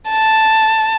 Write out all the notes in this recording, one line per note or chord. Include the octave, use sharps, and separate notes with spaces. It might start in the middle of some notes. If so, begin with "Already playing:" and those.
A5